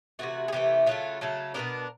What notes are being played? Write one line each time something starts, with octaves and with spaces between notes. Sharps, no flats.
C3 E3 A3 F#4
G#4
C3 E3 A3 G4
C#3 F#3 A3 F4
C#3 F#3 A3 A4
B2 G#3 B3 D4 A#4